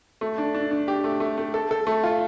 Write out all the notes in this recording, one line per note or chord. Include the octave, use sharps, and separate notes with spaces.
A3
D4
D4
D4
G4
A3
A3
A3
A4
A4
A3
F4